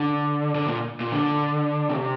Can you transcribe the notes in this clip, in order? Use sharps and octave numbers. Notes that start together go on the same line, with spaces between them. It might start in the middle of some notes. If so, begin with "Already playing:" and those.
Already playing: D3
D3
A#2
A#2
D3
C3